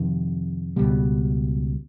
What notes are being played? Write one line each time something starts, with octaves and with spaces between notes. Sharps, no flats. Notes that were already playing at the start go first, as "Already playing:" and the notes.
Already playing: F2 C3 D#3
C#2 B2 G3